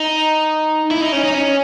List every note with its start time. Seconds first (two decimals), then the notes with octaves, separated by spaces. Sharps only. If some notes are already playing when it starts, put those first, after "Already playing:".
Already playing: D#4
0.91 E4
1.01 D#4
1.12 C#4
1.24 D#4
1.34 C#4